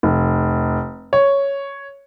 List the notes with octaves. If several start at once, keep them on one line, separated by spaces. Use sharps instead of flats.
F1
C#5